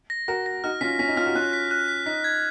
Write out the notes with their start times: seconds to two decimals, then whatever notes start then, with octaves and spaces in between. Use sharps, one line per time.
0.10 A#6
0.28 F#4 A#4 A#6
0.46 A#6
0.64 D#4 F#4 F6
0.81 C#4 F4 B6
0.99 C#4 B6
1.08 D#4
1.17 C#4 F4 F6
1.26 D#4 F#4
1.35 C#4 F4 F#6
1.53 B6
1.71 F#6
1.88 B6
2.06 D#4 B6
2.24 G#6